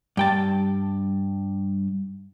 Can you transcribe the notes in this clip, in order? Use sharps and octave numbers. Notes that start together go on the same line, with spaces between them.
G2 G5 A5